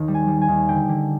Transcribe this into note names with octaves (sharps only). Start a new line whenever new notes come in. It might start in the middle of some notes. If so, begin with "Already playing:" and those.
Already playing: D#2 D#3
G3
G#5
G3
G#5
D#2
D3 G5
D3